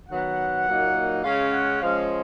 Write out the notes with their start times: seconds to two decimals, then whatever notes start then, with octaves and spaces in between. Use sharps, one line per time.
0.08 D#3 F#3 B3 F#5
0.66 A#2 F#3 A#3 D#4
1.23 C#3 G#3 C#4 F5
1.52 F#5
1.81 F3 G#3 C#4 F5